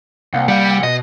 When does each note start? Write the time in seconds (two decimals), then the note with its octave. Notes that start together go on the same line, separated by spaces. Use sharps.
0.34 C2 A#3 F5 F#5
0.48 C2 G3 F#5 C#7
0.83 B2 D#5